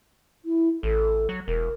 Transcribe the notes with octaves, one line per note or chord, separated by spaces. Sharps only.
E4
A1 A4
F#3
E1 A#4